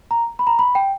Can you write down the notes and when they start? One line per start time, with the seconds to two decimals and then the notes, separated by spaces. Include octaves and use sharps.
0.11 A#5
0.39 B5
0.47 A#5
0.59 B5
0.75 G5